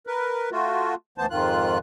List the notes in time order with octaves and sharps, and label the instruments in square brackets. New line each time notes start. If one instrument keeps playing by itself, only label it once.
[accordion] A#4 B4
A3 F4 F#4
D2 E3 B3 C5 A5
F2 G#2 D#3 F4 F#6